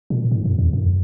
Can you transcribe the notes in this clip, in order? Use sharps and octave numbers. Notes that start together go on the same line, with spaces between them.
A#2
G#2
F#2
E2
F#2